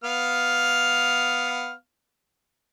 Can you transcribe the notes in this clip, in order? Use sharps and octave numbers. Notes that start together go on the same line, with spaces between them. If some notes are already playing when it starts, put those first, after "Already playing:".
B3 F5 F6